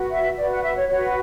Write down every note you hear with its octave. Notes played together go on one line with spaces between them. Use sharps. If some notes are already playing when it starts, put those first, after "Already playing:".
Already playing: F#4 B4
E5
F#4 B4 D5
F#5
E5
C#5
F#4 B4 C#5